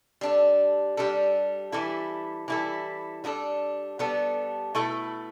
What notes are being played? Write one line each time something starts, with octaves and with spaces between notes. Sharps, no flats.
G3 D4 A4
G3 D4 A4
E3 G3 E4 A4
E3 G3 E4 A4
G3 B3 D4 A4
G3 B3 D4 A4
B2 A3 E4 A4